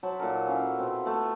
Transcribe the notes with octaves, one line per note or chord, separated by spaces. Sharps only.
F#3 C5 A5 B5
A#2 D#4 A4 A#4
C#4 E4 F5
B2 C4
A3 B3